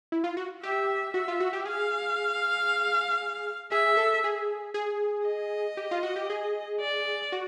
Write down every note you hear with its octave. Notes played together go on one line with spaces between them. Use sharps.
E4
F4
F#4
G4 E5
F#4 E5
F4
F#4
G4
G#4 F5
G#4 E5
A4
G#4
G#4
D#5
G4
F4
F#4
G4
G#4
D5
F#4